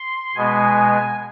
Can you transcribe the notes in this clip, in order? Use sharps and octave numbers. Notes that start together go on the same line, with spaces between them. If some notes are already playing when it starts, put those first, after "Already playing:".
Already playing: C6
B2 G#3 B3 G#5